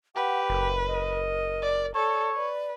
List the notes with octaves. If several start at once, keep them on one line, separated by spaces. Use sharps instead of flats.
G4 B4 F#5
F#1 A#4
D#5
D5
A4 C#5 D5
B4 D5